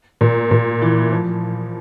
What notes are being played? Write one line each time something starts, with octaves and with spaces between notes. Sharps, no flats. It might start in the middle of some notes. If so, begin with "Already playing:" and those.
A#2
A#2
E3
F3